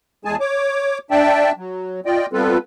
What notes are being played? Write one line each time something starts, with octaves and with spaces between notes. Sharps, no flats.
E2 G#3 G#4 G#5 A5
C#5 D6
D4 D5 E5 G5 A5
F#3
F4 D5 D#5 G5
G3 B3 C4 F4 A4 B4